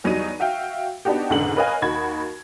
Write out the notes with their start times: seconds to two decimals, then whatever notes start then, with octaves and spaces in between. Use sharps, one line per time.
0.04 E2 F#3 G3 D#4 D#7
0.40 F#4 E5 F5 G5
1.05 B3 D4 D#4 F#4 G4
1.30 F1 C#2 G#2 D3 F#5 F#7
1.56 A#4 B4 C#5 D#5 F5 G#5
1.82 D#2 D#4 F#4 B5 G#6